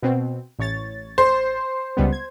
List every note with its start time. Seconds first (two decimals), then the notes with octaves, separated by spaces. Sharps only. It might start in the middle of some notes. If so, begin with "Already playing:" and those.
0.03 B2 C4
0.59 A1 C#5 A6
1.18 C5
1.97 C#2 G3 B3
2.12 G#6